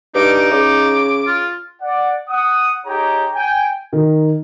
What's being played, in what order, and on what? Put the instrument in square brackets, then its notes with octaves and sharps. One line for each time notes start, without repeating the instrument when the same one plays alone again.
[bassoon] G2 [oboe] D#4 [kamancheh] D6
[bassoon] C#3 [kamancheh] D6
[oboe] F4
[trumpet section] D5 F#5
F#5 D#6
D#4 G4 G#4 C#5 G5 A#5
G5 G#5
[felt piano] D#3